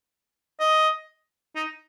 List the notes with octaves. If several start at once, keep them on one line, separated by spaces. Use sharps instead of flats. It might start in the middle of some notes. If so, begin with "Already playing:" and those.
D#5
D#4